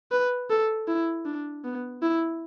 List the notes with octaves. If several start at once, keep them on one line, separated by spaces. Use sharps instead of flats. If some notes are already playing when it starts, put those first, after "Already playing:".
B4
A4
E4
D4
B3
E4